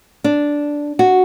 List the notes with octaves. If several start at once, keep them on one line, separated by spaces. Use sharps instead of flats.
D4
F#4